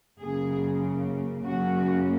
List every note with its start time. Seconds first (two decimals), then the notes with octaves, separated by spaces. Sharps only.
0.20 F#2 C#3 A#3 G#4
1.44 F#2 C#3 F#3 A#3 C#4 F#4